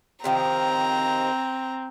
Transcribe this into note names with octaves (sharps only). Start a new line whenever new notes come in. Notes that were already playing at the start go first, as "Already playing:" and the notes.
C3 D#3 F3 C4 A#5